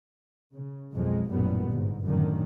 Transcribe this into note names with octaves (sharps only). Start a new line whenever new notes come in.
C#3
B1 F2 G#3
A1 F#2 A#2 G3 B3
G1 G#2
F#2 A2 D3 D#3